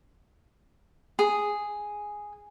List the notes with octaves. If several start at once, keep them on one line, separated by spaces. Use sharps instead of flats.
G#4